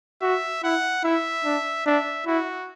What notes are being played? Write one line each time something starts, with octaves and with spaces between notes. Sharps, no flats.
F#4 E5
E4 F#5
E4 E5
D4
D4 E5
E4 F#4